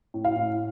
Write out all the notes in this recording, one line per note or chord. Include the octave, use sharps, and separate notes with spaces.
A2
F5
A2